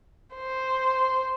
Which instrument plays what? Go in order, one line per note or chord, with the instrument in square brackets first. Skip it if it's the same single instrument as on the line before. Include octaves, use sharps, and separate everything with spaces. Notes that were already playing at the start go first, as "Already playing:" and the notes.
[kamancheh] C5